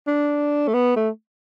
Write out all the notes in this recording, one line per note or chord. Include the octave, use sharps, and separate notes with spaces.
D4
A3
B3
A3